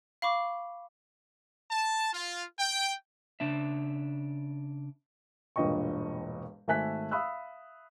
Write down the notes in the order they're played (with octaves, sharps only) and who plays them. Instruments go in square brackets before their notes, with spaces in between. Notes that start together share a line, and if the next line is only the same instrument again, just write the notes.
[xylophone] F5 B5 C#6 D6
[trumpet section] A5
F4
G5
[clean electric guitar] C#3 D4 E5
[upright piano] E1 G2 A#2 D#5 G5 C#6
G#1 A3 E5 G#5 F#6 B6
E5 F5 B5 D#6 E6 F#6